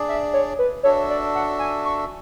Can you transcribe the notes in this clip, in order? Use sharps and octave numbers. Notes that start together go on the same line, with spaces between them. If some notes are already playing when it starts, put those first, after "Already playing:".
Already playing: D4 G#4 D5
E5
C#5
B4
D4 F#4 A4 C#5 E5
D5
F#5
G#5
C#6